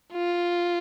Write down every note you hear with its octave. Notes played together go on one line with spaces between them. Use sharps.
F4